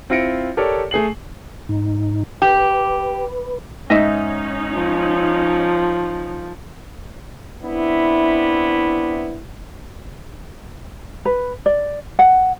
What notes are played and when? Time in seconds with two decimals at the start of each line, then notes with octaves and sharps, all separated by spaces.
0.10 C4 E4 F4 A#6 C#7 D7
0.57 G4 A4 A#4 C#5 D5
0.91 A3 G#4 C7 F#7
1.69 G#2 D#4
2.42 G4 B4
3.90 G#2 C#4 D#4 D#5 E5
4.74 F3
7.63 B3 C4 D4 E4
11.25 B4
11.66 D5
12.19 F#5